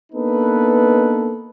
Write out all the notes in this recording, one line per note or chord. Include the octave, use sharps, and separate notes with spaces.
A#3 B3 D4 D#4 A4 B4